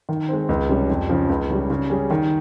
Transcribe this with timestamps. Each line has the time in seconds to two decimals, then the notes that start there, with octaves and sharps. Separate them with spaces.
0.09 D#3
0.29 G#3 C4
0.49 C#2
0.69 C3 G3 C#4
0.90 F2
1.09 C#3 F3
1.29 C#2
1.50 C#3 G3
1.70 C#3
1.90 G3 C#4 G#4
2.10 D#3